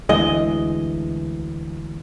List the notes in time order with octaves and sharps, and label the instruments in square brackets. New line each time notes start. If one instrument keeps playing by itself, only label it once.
[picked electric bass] D2 E3 G#3 [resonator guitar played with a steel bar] D#5